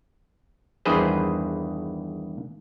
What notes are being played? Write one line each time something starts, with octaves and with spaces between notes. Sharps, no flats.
E2 G2 D#3 G#4 B4 C5